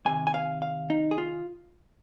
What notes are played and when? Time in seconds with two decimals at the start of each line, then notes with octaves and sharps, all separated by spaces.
0.05 C2 C3 D#3 G#5
0.27 G#5
0.34 F5
0.62 F5
0.90 D#4
1.11 G#4
1.18 F4